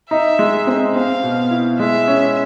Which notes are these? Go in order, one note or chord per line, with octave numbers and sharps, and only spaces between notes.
D#4 E5
G#3
C4
C4 F5
B2
E4
G#3 E5
C#4